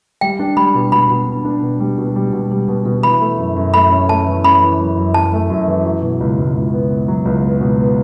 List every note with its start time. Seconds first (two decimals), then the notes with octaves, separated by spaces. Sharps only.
0.21 G3 G5
0.39 D4
0.57 G3 B5
0.75 B2
0.92 B2 B5
1.10 B2
1.27 D4
1.45 D4
1.62 B2
1.80 G3
1.98 B2
2.16 G3
2.33 B2
2.51 G3
2.68 B2
2.85 B2
3.03 E3 B5
3.21 A3
3.39 F#2
3.56 F#2
3.74 A3 B5
3.91 C#4
4.09 A3 A5
4.26 E3
4.44 C#4 B5
4.62 E3
4.80 F#2
4.97 F#2
5.14 F#2 A5
5.33 A3
5.50 F#2
5.67 E3
5.85 F#3
6.02 B2
6.20 C#2
6.38 C#2
6.56 C#2
6.73 B3
6.90 B3
7.08 F#3
7.25 C#2
7.43 B3
7.61 B2
7.78 B3